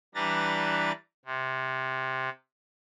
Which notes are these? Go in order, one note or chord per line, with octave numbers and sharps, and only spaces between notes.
E3 G3 D4 B4 A#5 A6
C3